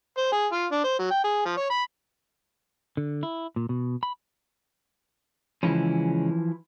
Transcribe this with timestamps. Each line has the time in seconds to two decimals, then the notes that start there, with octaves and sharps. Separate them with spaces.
0.17 C5
0.32 G#4
0.52 F4
0.72 D4
0.84 C5
0.99 F#3
1.11 G5
1.24 G#4
1.45 F3
1.57 C#5
1.70 B5
2.97 D3
3.23 E4
3.56 A#2
3.69 B2
4.03 B5
5.63 C#3 E3 F3 G#3 C#4